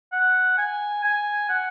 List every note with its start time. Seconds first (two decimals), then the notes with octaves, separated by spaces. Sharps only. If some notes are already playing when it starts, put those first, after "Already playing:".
0.12 F#5
0.58 G#5
1.04 G#5
1.49 F#5